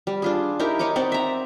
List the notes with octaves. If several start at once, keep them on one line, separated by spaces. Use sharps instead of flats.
G3
D4 F4 G#4
D#4 E4 G4 A#4
D#4 C#5 D#5 D6
C4 D#4 D5 F#5
E5 A#5